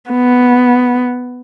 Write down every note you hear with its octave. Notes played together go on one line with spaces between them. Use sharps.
B3